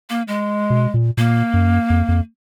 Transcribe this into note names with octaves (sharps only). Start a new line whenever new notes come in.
A#3
G#3
B2
A#2
A#2 A#3
F#2
F2
F2